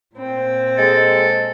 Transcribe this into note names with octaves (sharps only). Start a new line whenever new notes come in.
A#2 C4
G#3 A4